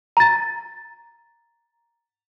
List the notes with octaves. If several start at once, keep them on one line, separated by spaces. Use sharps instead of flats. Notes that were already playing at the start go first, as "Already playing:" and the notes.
A#5 A6